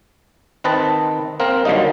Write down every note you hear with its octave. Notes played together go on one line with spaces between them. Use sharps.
D#3 C4 B4 D#5 A5
A#3 C4 A#4
D3 F#3 G3 A#3 D#4